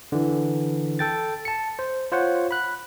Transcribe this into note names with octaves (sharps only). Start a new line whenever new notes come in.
D3 E3
A4 G5 A6
A5 C#7
C5
F4 C5 C#5 F#5
B5 F#6